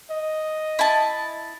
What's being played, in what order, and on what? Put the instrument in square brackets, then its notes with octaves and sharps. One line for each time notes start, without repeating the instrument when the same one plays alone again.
[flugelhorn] D#5
[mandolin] E4 A5